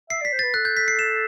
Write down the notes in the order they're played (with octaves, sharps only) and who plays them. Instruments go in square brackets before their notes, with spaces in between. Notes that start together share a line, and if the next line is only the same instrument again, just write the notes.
[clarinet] E5 [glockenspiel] C7
[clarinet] D5 [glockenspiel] B6
[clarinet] C5
[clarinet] B4 [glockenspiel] A6
[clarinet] A4 [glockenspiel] F#6
[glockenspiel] G6
B6
C7
E7